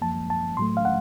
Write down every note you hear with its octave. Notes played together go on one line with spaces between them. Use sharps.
F#2 F3 A#3 A5
A5
A2 F#3 A3 C6
F5
F#5